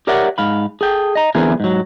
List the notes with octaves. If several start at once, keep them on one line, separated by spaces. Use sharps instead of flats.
G4 A#4 C#5 D5 E5 F#5
G#2 F5 B5
G#4 A4 G5
D#5 A#5
D3 E3 B3 C4 G#4 A#4
G#2 F#3